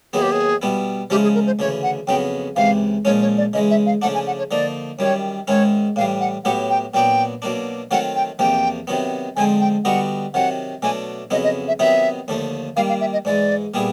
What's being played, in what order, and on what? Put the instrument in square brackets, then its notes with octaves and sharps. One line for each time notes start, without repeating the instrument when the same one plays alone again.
[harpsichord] D#2 D#3 F#3 B3 E4 [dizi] G#4
[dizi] G4
G#4
[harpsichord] B2 G3 B3 E4
[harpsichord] C#3 F3 G#3 C#4 E4 [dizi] G4
[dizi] G#4
A#4
C5
[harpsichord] D2 C#3 E3 [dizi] C#5
[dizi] F#5
[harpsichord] F2 C#3 F#3 B3 [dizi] G5
[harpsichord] C#2 C3 E3 [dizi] F5
[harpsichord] A#2 F3 G#3 C#4 [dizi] C#5
[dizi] C#5
D5
[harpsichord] C#3 E3 G#3 [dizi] D#5
[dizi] E5
F5
[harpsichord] C#3 F3 A3 D4 [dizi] F#5
[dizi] G#5
F#5
C#5
[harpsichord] D3 F3 A#3 D#4 [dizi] D5
[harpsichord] F#2 D#3 G3 [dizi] C#5
[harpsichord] G#2 D#3 G#3 C#4 E4 [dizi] C#5
[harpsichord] A2 E3 G3 [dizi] F5
[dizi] F#5
[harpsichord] A2 F#3 B3 E4 G4 [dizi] F#5
[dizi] G5
[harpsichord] A#2 F#3 B3 D4 [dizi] G5
[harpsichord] B2 F#3 A#3 D4
[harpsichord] D#3 F#3 A3 C4 F4 [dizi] F#5
[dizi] G5
[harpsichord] E2 C3 F3 A#3 [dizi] G5
[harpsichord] C3 D#3 F#3 B3
[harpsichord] D3 F3 G#3 C4 [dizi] G#5
[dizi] G5
[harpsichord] D3 G3 B3 D#4 F#4 [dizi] F#5
[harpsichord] C3 D#3 F#3 [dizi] F#5
[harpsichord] B2 F#3 A3 D4 [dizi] G#5
[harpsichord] F2 C#3 F#3 B3 E4 [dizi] D#5
[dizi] D#5
E5
[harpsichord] C3 D#3 F#3 B3 D#4 [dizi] E5
[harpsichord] D#2 D3 F3 A3
[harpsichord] D#3 G3 A#3 [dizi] F5
[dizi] F5
E5
D#5
[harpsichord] G#2 E3 G#3 [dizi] D5
[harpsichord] A#2 G3 B3 E4 G#4